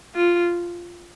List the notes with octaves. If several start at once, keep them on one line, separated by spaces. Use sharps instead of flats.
F4